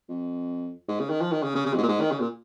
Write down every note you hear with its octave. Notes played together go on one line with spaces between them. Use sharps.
F2
G#2
C#3
D#3
F3
D#3
C#3
C#3
C#3
F2
G#2
A#2
G#2
D#3
C#3
A#2